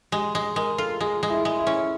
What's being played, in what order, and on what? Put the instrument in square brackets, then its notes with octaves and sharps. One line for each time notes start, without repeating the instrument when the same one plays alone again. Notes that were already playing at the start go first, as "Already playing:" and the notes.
[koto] G#3 [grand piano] G4
[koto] G#3 [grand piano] G#4
[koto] G#3 [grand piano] A#4
[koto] F4 [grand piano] A4
[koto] G#3 [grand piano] G#4
[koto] G#3
[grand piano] E4
[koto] G#3
[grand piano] E4
[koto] C#4